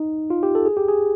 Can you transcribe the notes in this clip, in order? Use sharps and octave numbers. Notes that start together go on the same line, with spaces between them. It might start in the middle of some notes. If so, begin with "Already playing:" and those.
Already playing: D#4
F4
G4
A4
G#4
G4
G#4